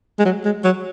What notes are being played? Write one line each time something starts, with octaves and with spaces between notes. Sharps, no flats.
G#3
F#3
G#3
F#3